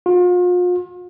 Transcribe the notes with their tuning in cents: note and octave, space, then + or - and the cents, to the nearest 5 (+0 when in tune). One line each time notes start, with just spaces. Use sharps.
F4 +40